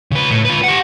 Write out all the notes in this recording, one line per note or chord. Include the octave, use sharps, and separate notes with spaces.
C#3 B4
A2
F4 B4
G4 F#5